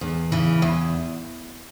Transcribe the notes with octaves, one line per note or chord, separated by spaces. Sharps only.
E2
C#3 E3
E2